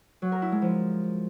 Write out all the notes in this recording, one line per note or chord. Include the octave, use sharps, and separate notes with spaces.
F#3
A#4
E4
G#3
F3